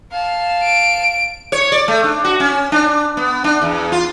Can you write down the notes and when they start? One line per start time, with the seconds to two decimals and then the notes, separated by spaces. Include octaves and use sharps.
0.12 F5 A5
0.63 D7
1.52 C#5
1.72 D5
1.88 A3
2.04 D4
2.25 F#4
2.40 C#4
2.72 D4
3.17 B3
3.44 D4
3.62 E2
3.92 F4